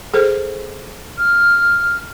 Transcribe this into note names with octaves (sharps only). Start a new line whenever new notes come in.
G#4 A4 C5
F6